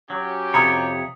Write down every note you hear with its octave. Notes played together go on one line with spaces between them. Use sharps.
F#3 C#4 F#4 G4
F2 C3 C#5 A#5 B5 D#6